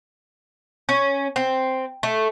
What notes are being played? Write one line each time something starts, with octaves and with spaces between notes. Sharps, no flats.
C#4
C4
A3